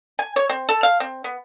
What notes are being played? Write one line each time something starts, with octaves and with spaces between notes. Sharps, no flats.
G#5
C#5
C4
A4
F5
C4
B3